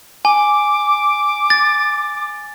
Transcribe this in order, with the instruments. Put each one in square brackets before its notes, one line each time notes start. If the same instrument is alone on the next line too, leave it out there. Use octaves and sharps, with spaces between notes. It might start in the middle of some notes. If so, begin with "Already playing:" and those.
[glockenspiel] G#5 [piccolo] D6
[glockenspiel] A6